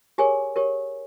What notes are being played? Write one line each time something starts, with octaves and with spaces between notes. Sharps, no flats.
G4 G#4 A#4 C#5 G#5
G4 A#4 C#5